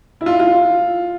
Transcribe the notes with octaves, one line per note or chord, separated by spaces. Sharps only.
E4
F4
F4